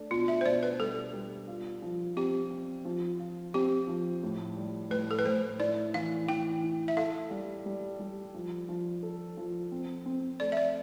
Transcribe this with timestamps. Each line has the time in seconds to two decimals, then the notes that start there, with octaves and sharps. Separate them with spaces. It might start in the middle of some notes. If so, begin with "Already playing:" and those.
Already playing: A3 D4
0.11 B2 F4
0.28 E5
0.41 C5
0.45 B2 D5
0.63 B4
0.79 G3 A4
1.13 G3
1.48 F4
1.82 F3
2.16 C4 G4
2.50 C4
2.85 F3
3.20 F4
3.54 C4 G4
3.88 F3
4.23 A2
4.56 G3
4.91 A2 B4
5.11 A4
5.19 B4
5.25 A2 C5
5.59 E4 D5
5.94 E3 F5
6.28 E3 G5
6.63 E4
6.88 E5
6.97 A4 F5
7.31 G3
7.66 G3
7.99 G3
8.34 F3
8.69 F3
9.03 A4
9.37 F3
9.72 C4
10.06 C4
10.40 A3 D5
10.52 E5
10.57 D5